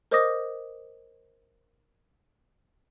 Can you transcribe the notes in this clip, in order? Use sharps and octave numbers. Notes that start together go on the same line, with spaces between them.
A#4 C5 D#5 D6 D#6 A#6